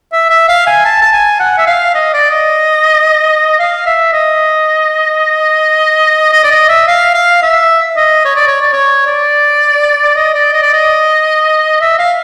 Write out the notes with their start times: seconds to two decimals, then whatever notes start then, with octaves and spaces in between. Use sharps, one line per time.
0.13 E5
0.30 E5
0.48 F5
0.67 G#5
0.85 A5
1.02 A5
1.13 G#5
1.39 F#5
1.58 E5
1.67 F5
1.95 D#5
2.13 D5
2.30 D#5
3.59 F5
3.86 E5
4.13 D#5
6.33 D#5
6.44 D5
6.51 D#5
6.69 E5
6.87 F5
7.14 F5
7.42 E5
7.96 D#5
8.25 C#5
8.36 D5
8.48 C#5
8.61 D5
8.73 C#5
9.07 D5
10.16 D#5
10.34 D5
10.53 D#5
10.63 D5
10.73 D#5
11.80 E5
11.99 F5